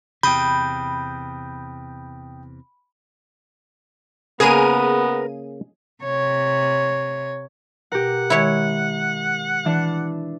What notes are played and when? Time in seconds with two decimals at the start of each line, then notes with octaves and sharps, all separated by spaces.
0.23 E2 C3 G5 B5 D#6 G6
4.40 C#3 A#3 B3 G#4 A#4 B4 A#5 D#7
6.03 C3 C#5
7.92 B2 G4 A#4 F#5
8.30 D#3 G#3 E4 C#5
9.65 E3 D4